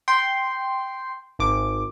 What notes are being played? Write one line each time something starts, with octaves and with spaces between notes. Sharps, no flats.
G5 C6
G#1 D6